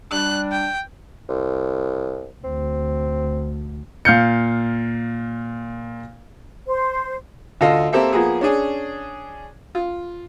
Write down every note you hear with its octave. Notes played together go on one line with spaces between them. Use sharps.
G3 D4 F#6
G5
C2
D2 C4
A#2 F5 G6 C#7
C5
D2 F4 A4 D#5 F5
A#3 C4 G4 A4 E5
F3 A#3 B3 G#4
C#4 D4 G#4
F4